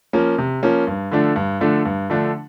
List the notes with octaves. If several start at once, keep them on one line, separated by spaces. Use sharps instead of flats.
F3 A#3 C#4
C3
F3 A#3 C#4
G2
D3 F3 A3 D4
G2
D3 F3 A3 D4
G2
D3 F3 A3 D4